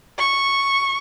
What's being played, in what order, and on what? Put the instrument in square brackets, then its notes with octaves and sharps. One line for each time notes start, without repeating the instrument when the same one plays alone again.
[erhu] C#6